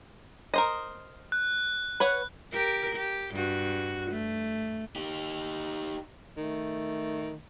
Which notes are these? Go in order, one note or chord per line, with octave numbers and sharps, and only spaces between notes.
A#4 C5 D#5
F#6
B4 C#5 F#5
G4 A#4
G4
G2 F#4
A3
D#4 G4
D#3 A3